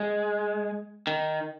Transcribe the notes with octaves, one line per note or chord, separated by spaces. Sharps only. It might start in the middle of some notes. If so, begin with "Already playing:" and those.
Already playing: G#3
D#3